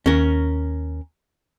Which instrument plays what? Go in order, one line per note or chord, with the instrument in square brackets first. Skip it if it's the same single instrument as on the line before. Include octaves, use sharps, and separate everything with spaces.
[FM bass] D#2 [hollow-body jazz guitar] C#4 A#4